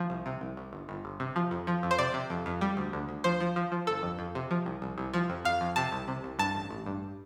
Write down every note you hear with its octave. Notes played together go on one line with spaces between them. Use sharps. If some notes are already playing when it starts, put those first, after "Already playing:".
Already playing: F3
C2
C3
C2
C2
G1
G1
G1
C3
F3
F2
F3
F2
C5
C3 D5
C3
F2
F2
G3
D2
D2
D2
F3 C5
F3
F3
F3
G1 A4
F2
F2
C3
F3
C2
C2
C2
F3
F2
F2 F5
F2
C3 A5
C2
C3
C2
G2 A5
A1
A1
G2